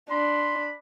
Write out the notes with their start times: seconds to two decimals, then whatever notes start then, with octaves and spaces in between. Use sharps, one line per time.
0.10 D4 B5 C6